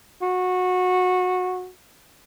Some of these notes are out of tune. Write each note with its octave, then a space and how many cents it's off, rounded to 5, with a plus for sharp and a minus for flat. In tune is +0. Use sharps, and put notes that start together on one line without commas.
F#4 -20